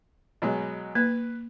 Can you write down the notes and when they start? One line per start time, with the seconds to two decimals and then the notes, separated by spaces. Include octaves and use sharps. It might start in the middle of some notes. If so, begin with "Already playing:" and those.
0.42 B2 F#3 G#3
0.95 A#3 B4